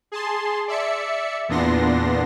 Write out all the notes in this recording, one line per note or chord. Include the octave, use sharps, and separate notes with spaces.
G#4 A5 C6
D5 E5 C#7
E2 A#2 B3 D4 C6 A#6